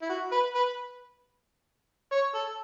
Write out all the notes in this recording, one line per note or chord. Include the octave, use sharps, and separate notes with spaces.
E4
F#4
B4
B4
C#5
A4